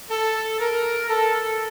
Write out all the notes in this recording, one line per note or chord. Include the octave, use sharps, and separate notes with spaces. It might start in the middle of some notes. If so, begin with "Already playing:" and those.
A4
A#4
A4